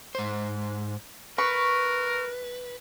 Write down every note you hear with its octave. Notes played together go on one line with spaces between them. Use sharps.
G#2 C5
A#4 B4 C#6